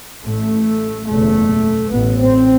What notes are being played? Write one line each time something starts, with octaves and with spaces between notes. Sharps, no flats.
A1 A2 A3
F#1 E2 B2 A3
A1 A2 B3
C4